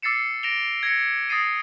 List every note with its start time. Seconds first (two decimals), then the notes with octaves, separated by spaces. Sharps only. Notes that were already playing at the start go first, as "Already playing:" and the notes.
0.03 D6 E6 A6 C7 C#7 E7
0.43 A#6 D7 E7 F7 G7
0.83 G#6 A#6 C#7
1.29 D#6 A6 A#6 C7 D#7